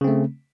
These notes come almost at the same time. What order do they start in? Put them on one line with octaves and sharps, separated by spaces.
C#3 C4 A3